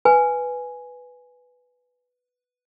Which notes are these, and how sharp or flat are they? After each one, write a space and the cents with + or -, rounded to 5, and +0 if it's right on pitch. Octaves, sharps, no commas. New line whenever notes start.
B4 +0 G#5 +0